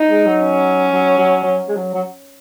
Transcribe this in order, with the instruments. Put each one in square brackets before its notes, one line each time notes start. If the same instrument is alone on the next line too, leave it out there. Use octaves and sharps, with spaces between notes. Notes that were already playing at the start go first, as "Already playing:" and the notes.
Already playing: [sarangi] D#4
[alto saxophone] G#3
F#3
[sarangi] C#4
[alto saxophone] F#3
F#3
F#3
G#3
F#3
F#3